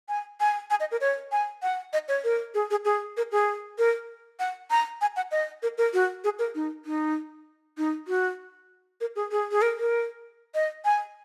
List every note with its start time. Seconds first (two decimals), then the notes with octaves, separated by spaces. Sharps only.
0.09 G#5
0.40 G#5
0.70 G#5
0.80 D#5
0.91 A#4
1.01 C#5
1.32 G#5
1.62 F#5
1.93 D#5
2.08 C#5
2.24 A#4
2.54 G#4
2.71 G#4
2.85 G#4
3.17 A#4
3.32 G#4
3.78 A#4
4.39 F#5
4.71 A#5
5.01 G#5
5.16 F#5
5.31 D#5
5.63 A#4
5.78 A#4
5.93 F#4
6.24 G#4
6.39 A#4
6.55 D#4
6.85 D#4
7.77 D#4
8.08 F#4
9.01 A#4
9.16 G#4
9.31 G#4
9.51 G#4
9.62 A#4
9.78 A#4
10.55 D#5
10.85 G#5